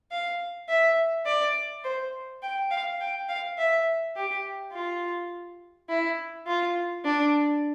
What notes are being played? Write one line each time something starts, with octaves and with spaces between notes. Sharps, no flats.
F5
E5
D5
C5
G5
F5
G5
F5
E5
G4
F4
E4
F4
D4